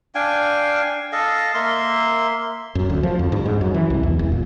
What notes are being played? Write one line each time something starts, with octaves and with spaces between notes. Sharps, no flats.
D4 F5 G5 G#5
A4 D#5 F5
A#3 E5 C6
F#2
D2
F3
F2
G2
G#2
F#2
E3
C2
E2
E1
A#2